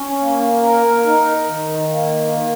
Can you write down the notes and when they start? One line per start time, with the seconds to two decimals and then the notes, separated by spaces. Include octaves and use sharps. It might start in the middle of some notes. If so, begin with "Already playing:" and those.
Already playing: C#4
0.20 A#3
0.62 A#4
1.05 D#4
1.48 D#3
1.90 A#3
2.32 D#3